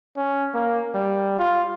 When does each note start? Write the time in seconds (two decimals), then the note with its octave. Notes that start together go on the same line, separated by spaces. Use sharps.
0.17 C#4
0.54 A#3
0.94 G3
1.39 F4